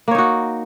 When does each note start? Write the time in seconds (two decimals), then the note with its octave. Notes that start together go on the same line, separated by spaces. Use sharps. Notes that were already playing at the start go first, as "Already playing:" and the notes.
0.08 A#3
0.11 C#5
0.15 D#4
0.18 F#4